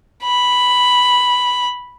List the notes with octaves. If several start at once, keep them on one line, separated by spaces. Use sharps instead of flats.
B5